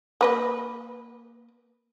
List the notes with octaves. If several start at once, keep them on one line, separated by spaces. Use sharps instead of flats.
A#3 B4 D#5